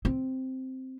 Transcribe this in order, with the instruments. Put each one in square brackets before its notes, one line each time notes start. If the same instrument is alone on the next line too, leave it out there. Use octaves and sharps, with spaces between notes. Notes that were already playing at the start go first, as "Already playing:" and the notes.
[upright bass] C4